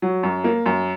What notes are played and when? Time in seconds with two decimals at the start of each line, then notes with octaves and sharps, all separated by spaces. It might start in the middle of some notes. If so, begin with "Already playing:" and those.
0.02 F#3
0.23 F#2
0.44 A#3
0.66 F#2